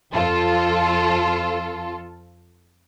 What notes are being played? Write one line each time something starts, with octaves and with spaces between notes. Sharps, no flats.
F2 F4 A4